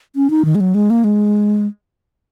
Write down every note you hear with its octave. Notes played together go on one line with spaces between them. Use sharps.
C#4
D#4
D#3
G#3
F#3
G#3
A#3
G#3